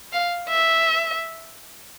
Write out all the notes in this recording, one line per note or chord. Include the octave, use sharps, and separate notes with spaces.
F5
E5